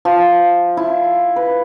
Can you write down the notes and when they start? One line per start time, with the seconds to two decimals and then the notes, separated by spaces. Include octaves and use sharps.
0.05 F3
0.77 E4
1.36 B4